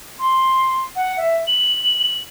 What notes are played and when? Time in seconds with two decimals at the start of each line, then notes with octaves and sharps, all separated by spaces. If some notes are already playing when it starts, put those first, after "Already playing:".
0.19 C6
0.96 F#5
1.17 E5
1.47 F#7